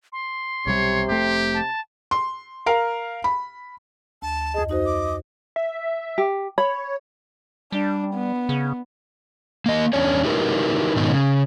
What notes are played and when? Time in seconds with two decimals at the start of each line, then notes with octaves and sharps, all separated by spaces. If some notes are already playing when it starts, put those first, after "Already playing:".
0.12 C6
0.67 B1 C3 G3 C#5
1.09 F1 A3 G4
1.54 A5
2.11 C6
2.66 A#4 F5
3.24 B5
4.22 D2 A5
4.54 F2 G#4 D#5
4.69 D#4 F#4 C5 D#5
4.86 D6
5.56 E5
6.18 G4
6.58 C#5 B5
7.72 G3 D4
8.14 B3
8.49 C#3
9.66 A#3 D#5
9.93 E2 C#4 D4 C#5
10.24 D#4 E4 F#4 G4 A#4 B4
10.96 G#2 B2 D#3 F#3 D#4
11.11 C#3